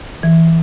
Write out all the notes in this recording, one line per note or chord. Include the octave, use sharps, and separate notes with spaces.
E3